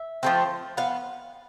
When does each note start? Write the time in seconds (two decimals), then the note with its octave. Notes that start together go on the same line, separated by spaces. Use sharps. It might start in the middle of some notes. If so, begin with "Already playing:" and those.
Already playing: E5
0.23 F3 A3 C4
0.77 B3 F5